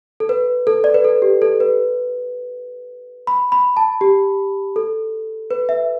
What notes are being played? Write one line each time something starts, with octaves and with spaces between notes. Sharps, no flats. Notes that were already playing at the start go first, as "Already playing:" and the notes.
A4
B4
A4
D5
B4
A4
G4
A4
B4
B5
B5
A5
G4
A4
B4
E5